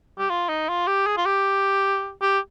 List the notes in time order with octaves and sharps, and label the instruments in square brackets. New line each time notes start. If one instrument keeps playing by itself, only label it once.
[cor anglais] G4
F4
D#4
F4
G4
G#4
F4
G4
G4